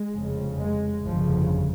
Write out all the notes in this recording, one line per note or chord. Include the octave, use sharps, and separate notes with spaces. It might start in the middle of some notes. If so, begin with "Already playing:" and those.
Already playing: G#3
F1 F2 C#3
G#3
G1 F2 C#3 F3